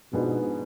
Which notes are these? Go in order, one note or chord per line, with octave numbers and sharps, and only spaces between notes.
G#2 B2 F3 B3 D4 G#4